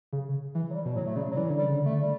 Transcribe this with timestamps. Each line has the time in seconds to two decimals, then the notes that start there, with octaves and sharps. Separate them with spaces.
0.13 C#3
0.55 E3
0.71 F#3
0.74 G3
0.85 B2
0.95 A2 F#3
1.06 A3
1.16 C#3 G3
1.31 F#3
1.36 E3 G3
1.50 D3
1.57 G3
1.64 C#3
1.77 D3
1.85 A3
2.02 G3